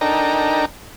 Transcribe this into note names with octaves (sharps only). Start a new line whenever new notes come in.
D4 D#4 A4 A#4 G5 A#5